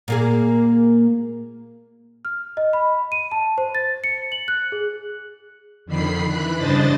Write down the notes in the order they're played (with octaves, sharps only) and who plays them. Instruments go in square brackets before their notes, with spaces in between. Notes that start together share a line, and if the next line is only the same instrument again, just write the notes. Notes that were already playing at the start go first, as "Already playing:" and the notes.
[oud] A#2 A#3 G#4
[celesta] F6
D#5
B5
D#7
A5
C5
A6
C#7
F#7
F#6
G#4
[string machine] F2 D3 D#3 B5 C7
E3 B5 F#6
G2 C#3 D4 C5 D#5 A6